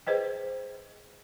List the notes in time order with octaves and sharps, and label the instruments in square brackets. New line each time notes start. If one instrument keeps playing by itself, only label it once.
[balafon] G#4 B4 C5 D#5 G5